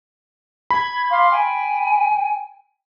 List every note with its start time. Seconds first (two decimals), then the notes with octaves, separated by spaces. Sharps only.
0.70 B5 G#6
1.09 F5 C6 D6
1.31 G5 G#5